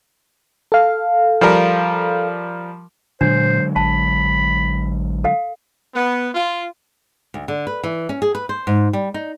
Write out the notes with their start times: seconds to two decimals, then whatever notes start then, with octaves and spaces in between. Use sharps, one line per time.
0.72 A4 F5
1.41 F3 G3 A#4
3.21 A#2 D3 F#3 G#3 D4 C5
3.76 A1 A5 B5
5.24 A4 F5 F#5
5.94 B3
6.34 F4
7.34 D2
7.48 D3
7.67 B4
7.83 E3
8.09 C#4
8.22 G#4
8.35 B4
8.49 C5
8.67 G#2
8.93 G3
9.14 D#4